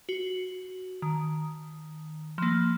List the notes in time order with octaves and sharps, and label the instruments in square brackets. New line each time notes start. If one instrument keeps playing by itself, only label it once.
[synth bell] F#4
D#3
F3 A#3